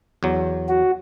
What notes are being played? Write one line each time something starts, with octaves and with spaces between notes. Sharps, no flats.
E2 F#3
F#4